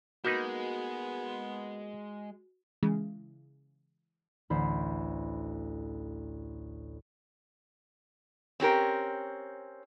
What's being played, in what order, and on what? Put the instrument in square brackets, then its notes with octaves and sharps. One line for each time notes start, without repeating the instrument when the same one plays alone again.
[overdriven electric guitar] G#3 [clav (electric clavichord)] A#3 D#4 B4 [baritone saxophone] B3 [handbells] F#4
[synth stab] C#3 E3 G#3
[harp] A1 D2 C5 B5
[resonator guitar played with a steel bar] C4 C#4 G4 A#4